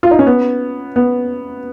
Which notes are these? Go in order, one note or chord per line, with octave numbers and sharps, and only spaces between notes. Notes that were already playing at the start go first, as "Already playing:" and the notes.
F4
D#4
C#4
B3
B3